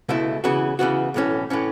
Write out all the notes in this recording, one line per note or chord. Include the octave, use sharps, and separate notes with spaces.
C#2 B2 A3 E4
C#3 E3 B3 F#4
C#3 E3 B3 F#4
B1 A2 E3 C#4
A2 E3 C#4